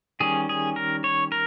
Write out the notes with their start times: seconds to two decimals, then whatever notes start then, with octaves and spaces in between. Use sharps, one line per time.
0.20 D#3 G3 C#4 G#4
0.49 G#4
0.76 A#4
1.04 C#5
1.32 A#4